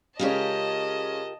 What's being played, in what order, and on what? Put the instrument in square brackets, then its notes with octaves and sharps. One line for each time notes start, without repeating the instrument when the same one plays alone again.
[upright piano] C#3 G#3 C#4 [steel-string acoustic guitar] F4 G4 A#4 [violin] D#5 A5